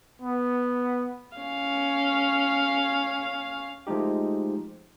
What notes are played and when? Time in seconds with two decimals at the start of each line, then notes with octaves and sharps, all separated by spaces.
0.22 B3
1.37 C#4 F5
3.87 F3 G#3 A3 D#4 G4